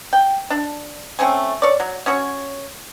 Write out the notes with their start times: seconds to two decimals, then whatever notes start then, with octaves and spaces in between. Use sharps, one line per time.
0.13 G5
0.50 D4
1.19 A3 C4 C#4 G#5
1.62 C#5 D5
1.80 F#3
2.06 C#4 F#4 C#5